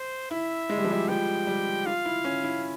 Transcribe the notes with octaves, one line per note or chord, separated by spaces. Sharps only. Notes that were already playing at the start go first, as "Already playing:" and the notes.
Already playing: C5
E4 E5
G#3
G3
F3
G3
F3 G5
G3
F4 F5
E4
C#4
E4